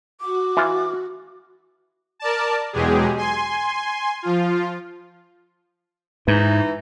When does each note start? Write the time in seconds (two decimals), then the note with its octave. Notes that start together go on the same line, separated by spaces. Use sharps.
0.20 F#4 D6
0.57 E3 F4
2.19 A#4 D5 A5
2.73 E2 B2 F#3 G#3 G4 G#4
3.17 G#5 C6
4.22 F3 F4
6.28 G#2 E3 D#4